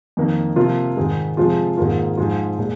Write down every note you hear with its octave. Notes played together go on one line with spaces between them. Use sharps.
F2 D#3 A#3
C3 F3 A#3 F4
G#2 D#3 G#3
C3 F3 G#3 F4
G#2 D#3 A#3 F4
G#2 F3 G#3 F4
A#2 G#3